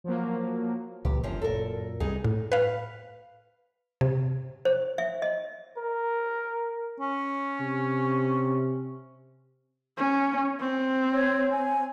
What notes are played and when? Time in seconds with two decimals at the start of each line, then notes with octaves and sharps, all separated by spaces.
0.04 F3 F#3 A#3
1.05 C#2 A#2 E3 G4
1.23 G1 F#2 F3
1.42 F#2 A#2 A4 A#4
2.00 C2 G2 D#4 G#4 G#5
2.24 A2
2.52 B4 F5
4.01 C3
4.65 C5
4.98 E5
5.22 D#5
5.77 A#4
7.00 C#4
7.60 C3
9.97 C#4
10.60 C4
11.13 C#5
11.51 G#5